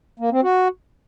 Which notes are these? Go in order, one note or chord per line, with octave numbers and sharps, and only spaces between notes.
A#3
C4
F#4